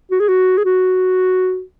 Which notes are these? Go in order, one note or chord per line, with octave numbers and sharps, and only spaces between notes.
F#4
G#4
F#4
G#4
F#4